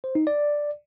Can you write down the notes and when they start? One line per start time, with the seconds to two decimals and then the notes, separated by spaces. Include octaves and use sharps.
0.04 C5
0.15 D#4
0.27 D5